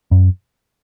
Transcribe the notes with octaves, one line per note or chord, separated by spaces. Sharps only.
F#2